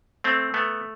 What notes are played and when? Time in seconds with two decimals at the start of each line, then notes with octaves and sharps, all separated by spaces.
0.24 A3 C4
0.54 A3 B3